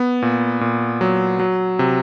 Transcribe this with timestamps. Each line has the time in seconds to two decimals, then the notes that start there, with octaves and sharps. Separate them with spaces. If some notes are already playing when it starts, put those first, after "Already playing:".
Already playing: B3
0.22 A#2
0.61 A#2
1.01 F#3
1.40 F#3
1.79 C3